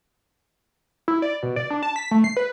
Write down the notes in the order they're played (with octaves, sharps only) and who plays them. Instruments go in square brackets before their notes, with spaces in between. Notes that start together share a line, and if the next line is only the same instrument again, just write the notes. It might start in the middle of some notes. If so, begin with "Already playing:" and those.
[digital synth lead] E4
D5
B2
D5
D4
A5
B6
A3
C7
B4